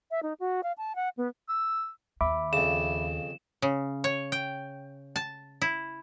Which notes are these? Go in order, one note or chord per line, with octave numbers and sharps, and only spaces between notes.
E5
D#4
F#4
F5
A5
F#5
B3
E6
D#2 E5 B5 D6
F2 C#3 E7
C#3
C#5
G5
A5
E4